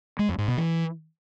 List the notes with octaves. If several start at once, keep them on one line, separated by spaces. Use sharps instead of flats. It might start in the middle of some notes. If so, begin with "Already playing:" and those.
G#3
F2
G#2
B2
E3